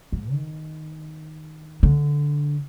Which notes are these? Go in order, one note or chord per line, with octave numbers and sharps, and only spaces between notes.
G#2
D#3
D3